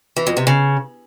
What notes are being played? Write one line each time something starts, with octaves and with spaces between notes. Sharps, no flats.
E3
F2
C3
C#3